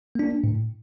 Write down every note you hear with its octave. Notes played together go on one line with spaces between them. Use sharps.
A#3 D4
A2